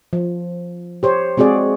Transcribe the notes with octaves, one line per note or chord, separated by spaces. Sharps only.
F3
G4 C5 C#5
G#3 C4 F#4 G#4 D5